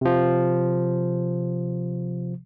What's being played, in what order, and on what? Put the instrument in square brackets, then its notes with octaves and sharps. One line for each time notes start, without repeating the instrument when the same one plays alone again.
[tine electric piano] C3 F3